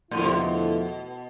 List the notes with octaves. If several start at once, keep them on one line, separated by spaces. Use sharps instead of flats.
E2 A2 D3 F3 A3 E4
C3
B2